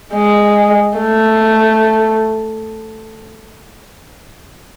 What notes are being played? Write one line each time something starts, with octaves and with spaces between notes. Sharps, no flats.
G#3
A3